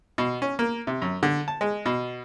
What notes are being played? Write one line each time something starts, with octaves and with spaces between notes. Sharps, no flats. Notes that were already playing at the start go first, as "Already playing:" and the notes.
B2
C#4
A#3
C3
F#2
D3
A5
G#3
B2